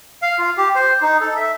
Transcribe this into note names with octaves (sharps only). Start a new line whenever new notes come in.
F5
F4
G4
C5
D#4
A4
E5